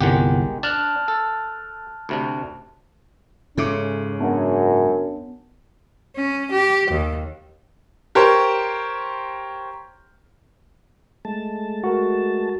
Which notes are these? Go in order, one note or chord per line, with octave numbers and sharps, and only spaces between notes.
G1 C2 D#3 G#3 G4 F#5
D4 A5 F6 F#6
A4
D2 C3 D4
G#2 C#3 C#4 A4 E5 D6
F#2 B3 D4 A5
C#4
G4
D#2
G4 A#4 C5 C#5
G#3 A3 A5
F#4 A#4